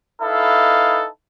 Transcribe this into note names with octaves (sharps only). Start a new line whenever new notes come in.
D#4 E4 A4 B4 F5